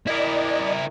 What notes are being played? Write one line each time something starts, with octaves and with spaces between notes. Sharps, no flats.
E4 A#4 D5 D#5